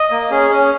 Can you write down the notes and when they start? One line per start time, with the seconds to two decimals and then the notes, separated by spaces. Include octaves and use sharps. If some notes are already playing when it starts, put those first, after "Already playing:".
Already playing: D#5
0.11 A#3
0.30 C#4 G#4
0.50 C#4